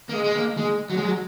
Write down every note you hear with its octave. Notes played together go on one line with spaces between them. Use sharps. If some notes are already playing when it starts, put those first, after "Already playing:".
A#3
G#3
G#3
A#3
G#3
F#3
G#3
F#3